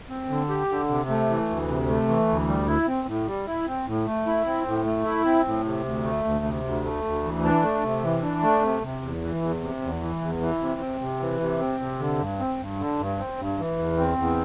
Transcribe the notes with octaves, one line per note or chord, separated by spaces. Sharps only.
C4
D3
G4
D3
C3
A3
E3
D2
C3
A3
E3
D2
G3
E4
C4
A2
G3
E4
C4
A2
A3
E4
C4
A2
A3
E4
C4
A2
C3
D2
A3
D2
C3
D2
A3
D2
E3
D4
A3
C3
E3
D4
A3
C3
C3
E2
E3
E2
C3
E2
E3
E2
E3
C3
C4
C3
E3
C3
C4
C3
D3
G2
C4
G2
D3
G2
C4
G2
E3
E2
C4
E2